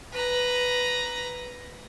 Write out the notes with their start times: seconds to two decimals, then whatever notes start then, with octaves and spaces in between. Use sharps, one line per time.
0.13 B4 A#5